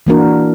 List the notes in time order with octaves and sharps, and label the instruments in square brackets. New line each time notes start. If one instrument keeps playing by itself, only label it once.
[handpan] E3 A#3 D4 F#4 A#4